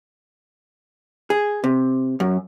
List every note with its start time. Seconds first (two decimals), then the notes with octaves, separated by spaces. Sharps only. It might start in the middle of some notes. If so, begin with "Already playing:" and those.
1.30 G#4
1.64 C3
2.20 F#2